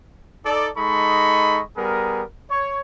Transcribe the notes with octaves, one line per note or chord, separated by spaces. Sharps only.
D#4 A4 D5
G#3 D#4 A4 D#5 B5 C#6
G3 B3 G#4 A#4
C#5